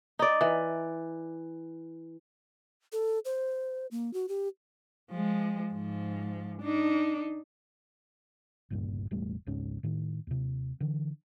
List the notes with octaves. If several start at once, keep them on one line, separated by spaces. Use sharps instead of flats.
D#4 D5
E3
A4
C5
A#3
F#4
G4
F3 G#3
G#2 F3
D4 D#4
G1 C#2 G2 A#2
E1 A1 G3 A3
G#1 C#2 G#2 C#4
A2 D#3
D#2 C3
D3 E3